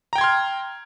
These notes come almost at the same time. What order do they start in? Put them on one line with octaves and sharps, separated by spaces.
A#5 G5 G#6 C6 F6